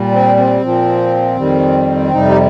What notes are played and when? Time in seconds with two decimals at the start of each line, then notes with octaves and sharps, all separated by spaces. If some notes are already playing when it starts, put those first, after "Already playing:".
Already playing: A#2 G3
0.12 C4
0.37 C4
0.62 A#2 F3
1.37 F2 D#3 G3
2.12 F2 C3 G3 D#4
2.29 G4